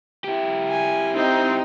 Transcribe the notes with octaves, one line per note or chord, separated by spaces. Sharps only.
E4 G4
G#5
C4 D#4